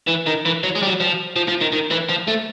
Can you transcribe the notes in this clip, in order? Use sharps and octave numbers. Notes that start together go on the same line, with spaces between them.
E3
D#3
E3
F#3
G#3
G3
F#3
F3
F3
F3
D#3
D#3
E3
F3
A3